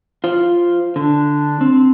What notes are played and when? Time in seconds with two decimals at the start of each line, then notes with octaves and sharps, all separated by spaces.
0.24 F4 C5
0.96 D3 D4
1.61 C4